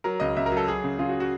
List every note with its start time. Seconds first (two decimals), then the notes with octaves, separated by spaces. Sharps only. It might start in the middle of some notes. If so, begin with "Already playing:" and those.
0.04 F#3 A#4
0.20 C#2 D#5
0.37 C#2 E5
0.46 A#4
0.52 F#3
0.57 A4
0.68 F#3 G#4
0.84 C#3
0.99 C#3 F4
1.09 F#4
1.20 F#4